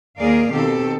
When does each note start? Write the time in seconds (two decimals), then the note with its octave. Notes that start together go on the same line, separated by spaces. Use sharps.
0.18 D#2 A#3 G#4 A#4 D5 F5
0.51 B2 D#3 C4 G4 A4